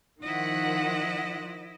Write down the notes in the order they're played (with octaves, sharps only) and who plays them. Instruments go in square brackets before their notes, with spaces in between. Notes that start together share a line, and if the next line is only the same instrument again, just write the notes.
[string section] D#3 F3 F#5 [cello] E4 D#5